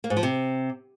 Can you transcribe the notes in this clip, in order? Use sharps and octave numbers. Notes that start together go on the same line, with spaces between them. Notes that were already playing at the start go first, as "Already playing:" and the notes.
A#3
G#2
F3
C3